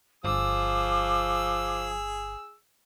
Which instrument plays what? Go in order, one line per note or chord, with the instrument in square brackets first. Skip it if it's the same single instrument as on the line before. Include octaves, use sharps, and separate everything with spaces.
[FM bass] G1 [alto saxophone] F3 [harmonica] G#4 E6 [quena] D6